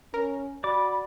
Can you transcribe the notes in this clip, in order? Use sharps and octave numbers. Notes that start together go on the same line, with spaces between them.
C#4 A#4
F#4 D5 B5 D6